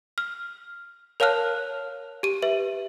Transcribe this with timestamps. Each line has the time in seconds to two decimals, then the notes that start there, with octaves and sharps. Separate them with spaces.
0.18 F6
1.20 A#4 C#5 F5 A5 F6 F#6
2.23 G4 D#7
2.42 B4 E5